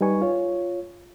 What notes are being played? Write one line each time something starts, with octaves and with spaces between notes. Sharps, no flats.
G3 D#4 B4 G#5 C#6
F4 C#5